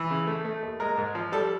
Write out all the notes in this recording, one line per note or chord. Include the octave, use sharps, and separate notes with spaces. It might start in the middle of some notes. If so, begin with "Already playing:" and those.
Already playing: E3
C#3
A3
A3
D#2
G#3 A#4
G#2
F3
G3 A4